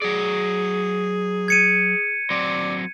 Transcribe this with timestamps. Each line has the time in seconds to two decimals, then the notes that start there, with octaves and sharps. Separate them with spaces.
0.02 F#3 G#4 D5
1.48 G#6 C#7 D#7
2.30 F#3 C4 D5